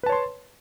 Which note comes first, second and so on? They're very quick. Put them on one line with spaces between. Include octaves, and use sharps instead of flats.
B4 A5 C#5 C6